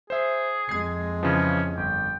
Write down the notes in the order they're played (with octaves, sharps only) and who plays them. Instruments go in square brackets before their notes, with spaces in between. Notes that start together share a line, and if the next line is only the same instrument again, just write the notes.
[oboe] G#4 [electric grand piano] C5 E5
[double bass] F2 G#3 [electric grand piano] G#6 C7
[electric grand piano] C#3 E3 F3 [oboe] C#4
[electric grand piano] G1 [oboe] G5